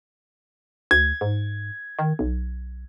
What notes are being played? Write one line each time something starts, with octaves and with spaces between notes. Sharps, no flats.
D2 G#6
G#2
D#3
B1